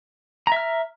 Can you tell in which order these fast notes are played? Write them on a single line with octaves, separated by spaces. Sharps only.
A#5 E5 F6